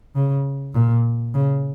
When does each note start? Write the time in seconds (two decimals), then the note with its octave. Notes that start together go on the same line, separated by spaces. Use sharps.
0.15 C#3
0.74 A#2
1.34 C#3